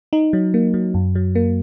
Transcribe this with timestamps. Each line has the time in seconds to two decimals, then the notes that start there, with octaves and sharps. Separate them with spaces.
0.13 D#4
0.33 F#3
0.54 A#3
0.74 F#3
0.94 F#2
1.15 F#3
1.35 A#3